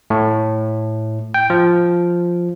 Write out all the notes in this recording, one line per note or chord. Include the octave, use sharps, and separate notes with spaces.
A2
G5
F3